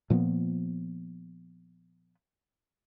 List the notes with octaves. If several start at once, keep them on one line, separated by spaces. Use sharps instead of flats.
A#2 F3 A#3 B3